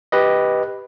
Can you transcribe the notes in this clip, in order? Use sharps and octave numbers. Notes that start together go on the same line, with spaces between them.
G4 B4 D#5